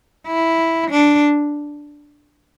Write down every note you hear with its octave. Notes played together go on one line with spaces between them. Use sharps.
E4
D4